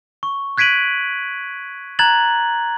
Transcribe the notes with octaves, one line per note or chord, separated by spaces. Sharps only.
C#6
F#6 G#6 B6 D7 D#7 F#7
A#5 F#6 G#6 A6 F#7